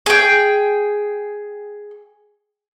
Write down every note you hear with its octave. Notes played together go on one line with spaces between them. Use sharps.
G#4 G5